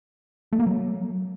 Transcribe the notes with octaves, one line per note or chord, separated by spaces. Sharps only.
A3
A#3
F#3